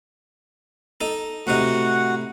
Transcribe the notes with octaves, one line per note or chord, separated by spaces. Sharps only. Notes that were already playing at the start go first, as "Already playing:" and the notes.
D#4 A4
A2 C3 D#4 F#4 F#5